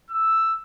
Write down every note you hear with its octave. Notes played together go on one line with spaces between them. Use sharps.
E6